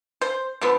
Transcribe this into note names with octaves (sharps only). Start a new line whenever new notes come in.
C5
D3 F3 B3